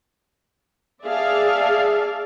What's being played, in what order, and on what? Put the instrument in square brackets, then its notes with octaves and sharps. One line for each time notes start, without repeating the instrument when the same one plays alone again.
[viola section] G#4 D5 E5 F5 A5